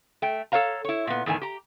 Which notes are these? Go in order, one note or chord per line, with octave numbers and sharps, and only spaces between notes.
A3 G5
A4 B4 C#5 F5 A#5
E4 C#5
A#2 B3
E2 A2 D#3 G#5
G4 A#5